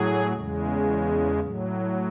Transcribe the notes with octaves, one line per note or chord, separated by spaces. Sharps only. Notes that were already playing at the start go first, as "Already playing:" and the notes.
Already playing: A2 F#3 G#4
E2 C#3 G#3
A2 F#3